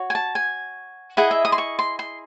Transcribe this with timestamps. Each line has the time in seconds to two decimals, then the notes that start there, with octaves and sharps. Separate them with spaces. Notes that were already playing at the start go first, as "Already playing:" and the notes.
Already playing: F#4 C#5
0.10 G#5
0.15 A5
0.35 G#5
1.17 E4 G#4 D#5 F#5
1.31 E5
1.45 D#6
1.52 C6
1.58 C#6
1.79 C6
1.99 C6